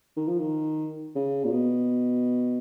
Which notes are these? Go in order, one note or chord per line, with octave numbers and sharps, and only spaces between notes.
D#3
F3
D#3
C#3
A#2
B2